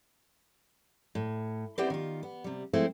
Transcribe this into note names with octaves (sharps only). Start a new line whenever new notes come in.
A2
B3 C4 E4 G4 C5 D5
D#3 F4
B3
C3 G3
F3 G#3 A3 C4 E4 C5